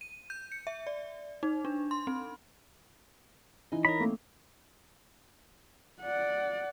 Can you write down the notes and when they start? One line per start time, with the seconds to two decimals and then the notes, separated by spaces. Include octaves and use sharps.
0.01 D#7
0.30 G6
0.52 C#7
0.67 E5
0.87 D5
1.43 D#4
1.65 D4
1.91 C6
2.07 C4
3.72 E3 D#4 E4 D#5 G#5
3.85 A#4 C#5 D#5 B5 D#6
4.00 A3 A#3 C4 A4
6.01 D5 F#5